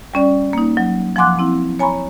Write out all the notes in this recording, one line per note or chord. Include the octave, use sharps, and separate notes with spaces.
G3 C#4 D5
A#3 D#4
F#3
F3 F#5 G#5 C6 D6 F#6
C4 E4
C#5 G#5 A#5 B5 C#6